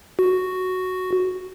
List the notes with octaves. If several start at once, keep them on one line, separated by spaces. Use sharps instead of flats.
F#4